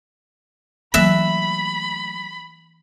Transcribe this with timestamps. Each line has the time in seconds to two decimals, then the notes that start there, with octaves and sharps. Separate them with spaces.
0.94 E3 F#3 A3 A#3 E5 B5 F#6